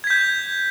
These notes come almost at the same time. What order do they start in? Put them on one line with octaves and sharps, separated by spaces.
G#6 B6 G6